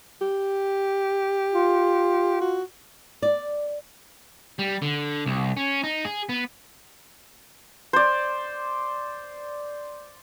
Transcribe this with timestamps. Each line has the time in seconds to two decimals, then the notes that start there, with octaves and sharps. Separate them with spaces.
0.22 G4
1.53 F4
2.41 F#4
3.22 D5
4.59 G3
4.82 D3
5.26 C2
5.57 C#4
5.84 D#4
6.05 G#4
6.29 B3
7.93 C5 D5